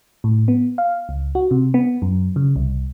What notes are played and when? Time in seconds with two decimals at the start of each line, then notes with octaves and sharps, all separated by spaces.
0.24 A2
0.48 B3
0.78 F5
1.09 C#2
1.35 F#4
1.51 C3
1.74 B3
2.02 F#2
2.36 C#3
2.56 C2